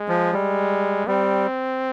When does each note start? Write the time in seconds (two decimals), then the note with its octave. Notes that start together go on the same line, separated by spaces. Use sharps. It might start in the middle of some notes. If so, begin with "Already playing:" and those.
Already playing: G#3
0.08 F3
0.33 G3 G#3
1.07 G3 C4